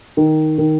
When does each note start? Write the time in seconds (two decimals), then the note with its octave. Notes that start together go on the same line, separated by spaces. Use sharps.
0.17 D#3
0.58 D#3